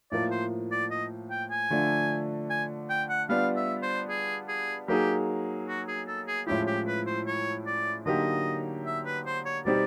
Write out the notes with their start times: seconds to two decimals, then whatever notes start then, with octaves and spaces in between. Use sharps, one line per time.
0.11 A2 F3 A#3 D5
0.31 C5
0.71 D5
0.91 D#5
1.31 G5
1.51 G#5
1.70 D3 F3 A3 D4
2.50 G#5
2.90 G5
3.09 F#5
3.29 G3 B3 D4 F4 F5
3.56 E5
3.83 C5
4.09 G#4
4.48 G#4
4.88 F#3 A#3 D#4 G4 G#4
5.68 F#4
5.88 G#4
6.07 A4
6.27 G#4
6.47 A2 F3 G#3 C#4 E4 G4
6.67 G4
6.87 B4
7.07 C5
7.27 C#5
7.66 D5
8.06 D3 F#3 A#3 D#4 G4 D#5
8.86 E5
9.06 B4
9.26 C5
9.45 C#5
9.65 B2 G3 C4 D#4 G4 D5